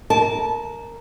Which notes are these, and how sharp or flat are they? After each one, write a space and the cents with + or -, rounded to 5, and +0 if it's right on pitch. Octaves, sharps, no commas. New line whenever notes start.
A#4 +0 A5 -25